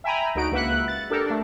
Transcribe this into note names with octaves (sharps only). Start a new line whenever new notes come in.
E5 G5 G#5 A#5 B5
D2 D#4 F#4 D7
C#2 A#3 B4 E5 F#5 F#6
A6
D4 G4 A4 A#4
A3 D4